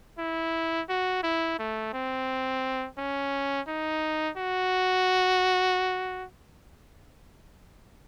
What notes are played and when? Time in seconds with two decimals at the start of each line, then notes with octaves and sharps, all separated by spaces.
0.19 E4
0.89 F#4
1.23 E4
1.59 A3
1.93 C4
2.98 C#4
3.68 D#4
4.37 F#4